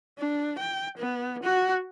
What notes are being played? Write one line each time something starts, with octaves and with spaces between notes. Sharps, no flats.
D4
G5
B3
F#4 F#5